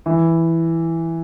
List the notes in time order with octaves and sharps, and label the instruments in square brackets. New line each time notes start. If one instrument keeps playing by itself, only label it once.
[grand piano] E3